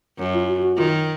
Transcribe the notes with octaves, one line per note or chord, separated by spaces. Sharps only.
F#2
F4
F#4
F#4
D#3 F4